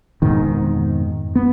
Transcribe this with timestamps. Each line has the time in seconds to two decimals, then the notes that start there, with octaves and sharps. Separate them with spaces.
0.22 F2 G#2 B2 D#3
1.35 B3